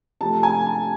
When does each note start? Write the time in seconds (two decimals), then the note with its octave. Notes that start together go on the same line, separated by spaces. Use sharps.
0.21 C3 F3 A3 A5
0.43 G#5
0.66 A5